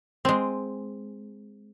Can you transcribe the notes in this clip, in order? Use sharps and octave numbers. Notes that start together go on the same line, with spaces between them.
G#3 C4